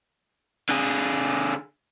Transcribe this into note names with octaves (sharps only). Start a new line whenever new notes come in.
D3 G#4